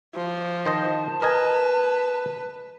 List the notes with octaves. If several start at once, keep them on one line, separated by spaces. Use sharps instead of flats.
F3
D#3 C5 D#5 A5
A#4 B4 D#5 G#5